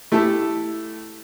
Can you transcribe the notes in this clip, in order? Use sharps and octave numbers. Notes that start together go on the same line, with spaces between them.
A3 E4 G4 A4